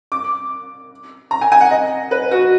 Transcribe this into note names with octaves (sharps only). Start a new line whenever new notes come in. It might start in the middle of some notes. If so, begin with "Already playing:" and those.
D6
A#5
G#5
G#5
F#5
D#5
B4
F#4